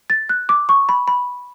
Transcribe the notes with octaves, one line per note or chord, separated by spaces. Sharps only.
A6
F#6
D6
C#6
B5
B5